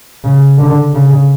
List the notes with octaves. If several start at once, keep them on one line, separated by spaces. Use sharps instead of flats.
C#3
D3
C#3